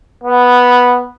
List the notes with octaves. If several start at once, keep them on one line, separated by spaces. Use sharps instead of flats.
B3